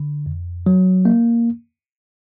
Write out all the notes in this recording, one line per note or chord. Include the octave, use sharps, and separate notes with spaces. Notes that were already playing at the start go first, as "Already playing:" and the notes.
Already playing: D3
F2
F#3
A#3